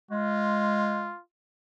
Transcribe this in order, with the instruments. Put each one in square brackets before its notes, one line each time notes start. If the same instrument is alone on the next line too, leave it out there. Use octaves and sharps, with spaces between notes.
[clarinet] G#3 [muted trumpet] F4